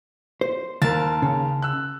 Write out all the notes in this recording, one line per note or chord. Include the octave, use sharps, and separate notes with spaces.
C5
D#2 A#4 A5
C#3
E6 F#6